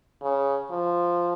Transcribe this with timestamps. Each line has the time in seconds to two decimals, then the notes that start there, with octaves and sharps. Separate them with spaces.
0.21 C#3
0.70 F3